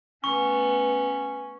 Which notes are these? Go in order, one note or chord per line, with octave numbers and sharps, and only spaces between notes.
A3 B3 C#4 C#6